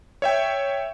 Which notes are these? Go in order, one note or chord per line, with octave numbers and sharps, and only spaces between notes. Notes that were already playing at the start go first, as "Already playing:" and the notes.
C#5 E5 G5